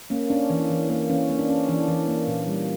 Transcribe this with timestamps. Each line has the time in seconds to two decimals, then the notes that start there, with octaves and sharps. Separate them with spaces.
0.10 A#3 C#4
0.30 C#4 D4
0.50 E3
0.70 E3
0.90 A#3
1.09 E3 C#4
1.30 A#3
1.39 D4
1.49 C#4
1.68 E3 D4
1.88 E3
2.08 A#3
2.28 A#2
2.48 G3